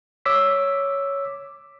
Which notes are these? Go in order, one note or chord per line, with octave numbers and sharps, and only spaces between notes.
C#5 D6 E6 B6